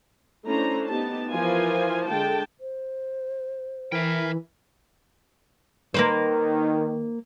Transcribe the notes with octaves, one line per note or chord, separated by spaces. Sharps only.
A3 C#4 D4 E4 C5 A#5
B3 D#4 G4 A5
E3 F3 F4 A#4 C5 G#5
D3 G#3 G5 A5
C5
E3 A#4 E5 G5 G#5 B5
D#3 A#3 B4 C5